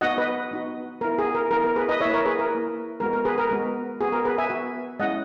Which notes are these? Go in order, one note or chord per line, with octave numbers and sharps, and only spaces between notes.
B3 D#4 F#4 D#5 F#5
B4 D#5
B3 D#4 F#4
B3 E4 A#4
G#4
A#4
B3 E4 A#4
A#4
G#4 B4
B4 D#5
A#3 E4 C#5 E5
A#4 C#5
G#4 B4
A#4
A#3 E4
G#3 B3 F#4 A#4
A#4
G#4 B4
A#4
G#3 B3 F#4
B3 F#4 G#4
A#4
G#4 B4
E5 G#5
B3 F#4
G#3 C#4 E4 D#5 F#5